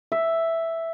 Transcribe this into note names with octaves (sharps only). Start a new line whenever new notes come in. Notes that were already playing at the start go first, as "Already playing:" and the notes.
E5